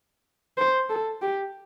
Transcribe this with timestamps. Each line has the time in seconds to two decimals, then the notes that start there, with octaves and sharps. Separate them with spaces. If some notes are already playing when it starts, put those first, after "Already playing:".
0.57 C5
0.90 A4
1.22 G4